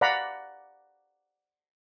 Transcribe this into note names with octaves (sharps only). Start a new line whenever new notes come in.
D5 F5 F#5 A#5 B5